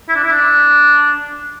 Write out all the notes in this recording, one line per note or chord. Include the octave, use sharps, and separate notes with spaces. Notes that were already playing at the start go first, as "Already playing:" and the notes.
E4
D4
E4
D4